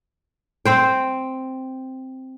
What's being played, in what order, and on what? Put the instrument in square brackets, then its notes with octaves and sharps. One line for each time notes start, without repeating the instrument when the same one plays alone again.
[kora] C4 C5 G5